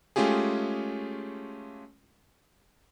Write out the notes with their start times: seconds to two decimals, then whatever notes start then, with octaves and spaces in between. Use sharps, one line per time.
0.16 G#3 A3 C#4 F4 G4 G#4